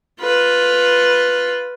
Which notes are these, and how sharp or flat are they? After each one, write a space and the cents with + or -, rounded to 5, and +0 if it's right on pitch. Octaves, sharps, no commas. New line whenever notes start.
F4 +5 B4 +0